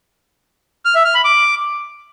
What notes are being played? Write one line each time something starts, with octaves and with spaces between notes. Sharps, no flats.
F6
E5
F6
B5
D6